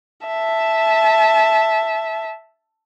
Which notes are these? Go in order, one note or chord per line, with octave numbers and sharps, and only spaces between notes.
E5 A5